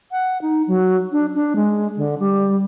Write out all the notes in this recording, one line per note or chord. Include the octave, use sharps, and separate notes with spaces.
F#5
D#4
F#3
D4
D4
G#3
D3
G3